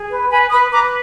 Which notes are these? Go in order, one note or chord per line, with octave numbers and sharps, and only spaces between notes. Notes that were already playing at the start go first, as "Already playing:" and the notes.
Already playing: G#4
B4
B4 G#5 B5
B4 B5 D#6
B4 A#5 D6